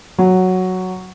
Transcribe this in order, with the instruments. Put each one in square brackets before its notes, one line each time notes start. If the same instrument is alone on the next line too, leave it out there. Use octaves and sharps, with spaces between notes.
[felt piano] F#3